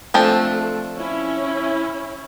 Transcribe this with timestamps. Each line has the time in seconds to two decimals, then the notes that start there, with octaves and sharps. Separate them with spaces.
0.14 F3 A3 C4 D4
0.96 C#4 E4